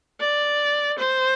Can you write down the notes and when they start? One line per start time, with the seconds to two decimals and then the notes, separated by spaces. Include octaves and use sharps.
0.20 D5
0.99 C5